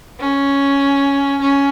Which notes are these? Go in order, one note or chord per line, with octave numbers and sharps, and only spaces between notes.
C#4
C#4